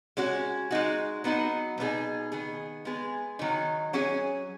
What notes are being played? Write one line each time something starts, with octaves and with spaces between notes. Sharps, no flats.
G#3 C#4 F#4
G#3 D#4 F#4
F#3 B3 D#4 F#4
B2 B3 D#4 G#4
D#3 B3 G#4
G#3 B3 G#4
D#3 F#3 D#4
F#3 C#4 G#4